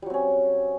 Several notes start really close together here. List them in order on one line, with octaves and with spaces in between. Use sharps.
G3 F#3 C4 C#4